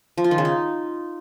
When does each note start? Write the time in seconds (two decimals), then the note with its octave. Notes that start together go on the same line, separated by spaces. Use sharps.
0.18 F3
0.24 F4
0.31 D#3
0.38 C#3
0.45 D#4